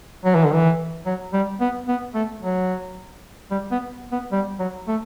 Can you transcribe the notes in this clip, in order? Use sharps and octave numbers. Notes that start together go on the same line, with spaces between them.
F#3
E3
D3
E3
F#3
G3
B3
B3
A3
F#3
G3
B3
B3
G3
F#3
A3